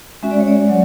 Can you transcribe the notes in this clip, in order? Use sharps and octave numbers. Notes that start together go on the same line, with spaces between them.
G#3 C#4 F#4 E5
D5
C#5
D5
F#3